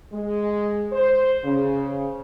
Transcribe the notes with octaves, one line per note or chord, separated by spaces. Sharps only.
G#3
C5
C#3